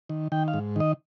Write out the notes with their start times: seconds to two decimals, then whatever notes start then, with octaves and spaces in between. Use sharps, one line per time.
0.10 D#3
0.32 D#3 G5
0.48 F5
0.54 G#2
0.76 D#3 D#5